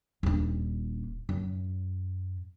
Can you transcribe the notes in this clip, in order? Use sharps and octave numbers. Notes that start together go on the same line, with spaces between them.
D#1 D4
F#2